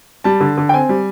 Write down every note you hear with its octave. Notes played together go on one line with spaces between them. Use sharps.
G3 A5
D3
D3
G5
C4 G#5
G3